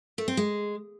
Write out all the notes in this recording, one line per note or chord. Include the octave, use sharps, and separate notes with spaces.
A3
C4
G#3